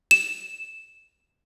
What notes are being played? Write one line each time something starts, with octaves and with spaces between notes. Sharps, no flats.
E7